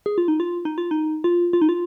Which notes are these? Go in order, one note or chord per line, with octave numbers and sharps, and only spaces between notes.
G#4
F4
D#4
F4
D#4
F4
D#4
F4
F4
D#4
F4